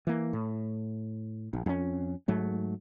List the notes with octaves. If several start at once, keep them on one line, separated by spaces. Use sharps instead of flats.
E3 A#3
A2
A#1
F2 C#4
G#2 F#3 A3